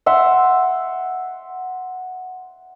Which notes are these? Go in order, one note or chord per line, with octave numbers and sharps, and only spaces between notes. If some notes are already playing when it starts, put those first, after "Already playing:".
E5 F#5 C6